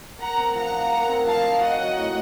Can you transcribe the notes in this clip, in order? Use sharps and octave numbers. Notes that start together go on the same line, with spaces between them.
A#4 F#5 A#5
C4
F3 F#5 A#5
D#4
A#4
C4
F3 F5 A5
D#4
F#4 D#5 F#5
F#3
A2